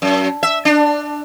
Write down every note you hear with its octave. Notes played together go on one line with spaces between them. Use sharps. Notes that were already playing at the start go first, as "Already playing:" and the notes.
F#2
E5
D4